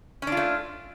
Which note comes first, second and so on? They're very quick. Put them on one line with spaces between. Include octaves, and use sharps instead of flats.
C#4 D4 F4 A3